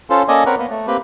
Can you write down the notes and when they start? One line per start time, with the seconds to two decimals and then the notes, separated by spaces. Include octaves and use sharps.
0.10 C#4 F4 A4 C5
0.28 A#3 C#4 A4 D5 D#5 G#5
0.46 C4 A#4 B4 C#5 F#5
0.58 A#3 B3
0.70 A3
0.87 A#3 C4 G4 B4